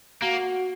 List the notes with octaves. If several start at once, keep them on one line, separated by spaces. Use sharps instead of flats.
A#3 F#4